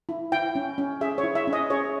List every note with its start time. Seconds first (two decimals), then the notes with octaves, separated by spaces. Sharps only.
0.09 E4
0.32 E4 G5
0.55 C#4
0.78 C#4
1.01 G#4 E5
1.18 C#5
1.23 E4
1.35 E5
1.47 C#4
1.53 D#5
1.70 G#4 C#5